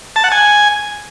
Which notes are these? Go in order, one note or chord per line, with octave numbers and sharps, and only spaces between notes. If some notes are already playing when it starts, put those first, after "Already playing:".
A5
F#5
G#5